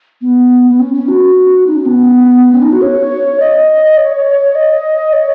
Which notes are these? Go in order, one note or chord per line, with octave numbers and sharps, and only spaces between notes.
B3
B3
C#4
C#4
F#4
D#4
C#4
B3
C#4
D#4
F#4
C#5
D#5
C#5
D#5
C#5